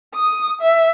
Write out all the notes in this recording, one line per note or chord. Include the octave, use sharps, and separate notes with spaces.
D#6
E5